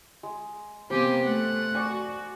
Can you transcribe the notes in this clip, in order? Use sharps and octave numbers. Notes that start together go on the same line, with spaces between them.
G#3
C3 A#3 B3 G4 C5 G#5
A3 F#5
F#4 D5 G#5